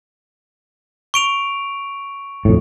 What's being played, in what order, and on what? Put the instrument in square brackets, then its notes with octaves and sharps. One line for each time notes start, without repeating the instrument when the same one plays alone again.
[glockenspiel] C#6 D7 F7
[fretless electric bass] F2 A2